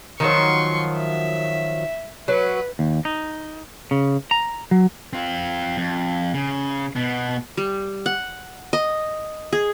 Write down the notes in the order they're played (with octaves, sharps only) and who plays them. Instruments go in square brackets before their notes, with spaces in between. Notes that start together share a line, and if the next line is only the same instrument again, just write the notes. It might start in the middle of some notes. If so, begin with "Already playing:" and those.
[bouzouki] D#3 F3 F#3 [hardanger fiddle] C6 C#6
[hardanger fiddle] E5
[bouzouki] F#3 [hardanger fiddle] B4
[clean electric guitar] D#2
D#4
C#3
A#5
F#3
[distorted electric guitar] C4 F4
F2
C#3
B2 B3
[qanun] G3
F#5
D#5
G#4